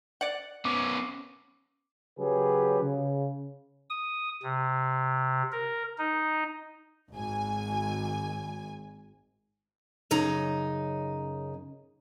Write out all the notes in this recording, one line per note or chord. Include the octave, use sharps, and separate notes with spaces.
D5 F#5
B3 C#4 D6
C#3 F#3 G4 G#4 B4
C#3
D#6
C3
A#4
D#4
G#1 G#5
F#2 C#3 D#4 A#5